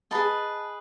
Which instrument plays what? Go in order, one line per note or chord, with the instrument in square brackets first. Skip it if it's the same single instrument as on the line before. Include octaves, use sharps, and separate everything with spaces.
[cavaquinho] G#4 B4 D#5 A5